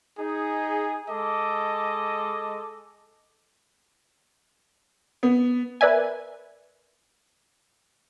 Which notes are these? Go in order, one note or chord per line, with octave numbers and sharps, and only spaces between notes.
D#4 G#4
G#3 A4 D#5 D6
B3
A#4 B4 D5 E5 G#5